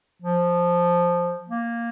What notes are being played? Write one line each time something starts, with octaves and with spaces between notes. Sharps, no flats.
F3
A#3